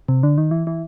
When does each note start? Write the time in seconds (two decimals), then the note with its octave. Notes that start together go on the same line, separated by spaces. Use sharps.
0.08 C3
0.23 D3
0.38 D#3
0.51 E3
0.67 E3